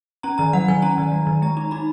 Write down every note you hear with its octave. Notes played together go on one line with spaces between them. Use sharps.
C#4 A#5
D#3 A#5
F#3 F#5
D#3 G#5
C#4 A#5
D#3
F#3
D#3
G#3 A#5
D#4 A#5
D#4 B5